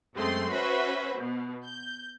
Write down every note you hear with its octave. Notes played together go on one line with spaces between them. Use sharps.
F#2 G#3 A3 C4 C6 C7
C#4 F#4 B4 C5 E5 B5
B2
G6